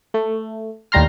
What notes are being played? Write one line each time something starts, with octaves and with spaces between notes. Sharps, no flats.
A3
D#2 A2 G3 A#5 C6 F6